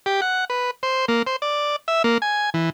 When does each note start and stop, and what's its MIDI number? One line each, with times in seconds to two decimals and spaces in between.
0.06 0.21 67
0.22 0.45 78
0.50 0.71 71
0.83 1.05 72
1.08 1.22 58
1.27 1.36 72
1.42 1.76 74
1.88 2.03 76
2.04 2.18 58
2.22 2.50 80
2.54 2.70 52